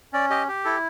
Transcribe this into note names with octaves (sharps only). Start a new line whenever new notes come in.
C#4 D5
G4 D#5
G4
E4 A4